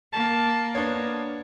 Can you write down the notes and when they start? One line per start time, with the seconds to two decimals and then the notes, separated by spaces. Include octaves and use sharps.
0.13 A#3 A5
0.75 B3 D4 C#5